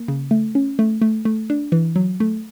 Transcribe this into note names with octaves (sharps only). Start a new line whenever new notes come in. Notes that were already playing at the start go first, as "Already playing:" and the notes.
Already playing: A#3
C#3
A3
C#4
A3
A3
A3
D4
E3
F#3
A3